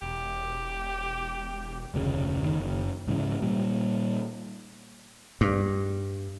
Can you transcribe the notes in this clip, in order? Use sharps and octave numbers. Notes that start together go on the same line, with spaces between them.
E1 G4
F1 D2 A#2 C#3
F#1 A#2 D#3
F#1
G#2 C#3 E3
A#2 G3
G2